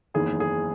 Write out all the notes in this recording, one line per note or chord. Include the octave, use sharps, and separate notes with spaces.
F#1 E2 D#3 G#4
G#4